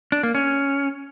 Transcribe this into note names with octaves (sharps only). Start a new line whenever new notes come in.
D4
A#3
C#4